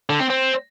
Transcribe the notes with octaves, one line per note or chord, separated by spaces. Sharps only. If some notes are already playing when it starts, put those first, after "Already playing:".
D3
C4
C4